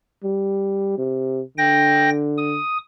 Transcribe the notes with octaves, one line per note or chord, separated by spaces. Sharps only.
G3
C3
D3 G5 A#6
D#6